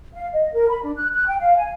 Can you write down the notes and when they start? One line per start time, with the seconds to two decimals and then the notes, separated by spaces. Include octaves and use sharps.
0.15 F5
0.33 D#5
0.54 A#4
0.69 B5
0.83 D4
0.97 F#6
1.13 F#6
1.27 G5
1.40 F5
1.58 G#5